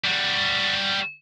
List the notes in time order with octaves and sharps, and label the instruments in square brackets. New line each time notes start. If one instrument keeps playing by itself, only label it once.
[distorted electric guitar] G3 F#4